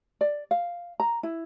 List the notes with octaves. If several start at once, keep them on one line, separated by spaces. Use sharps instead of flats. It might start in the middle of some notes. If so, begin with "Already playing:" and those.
D5
F5
A#5
E4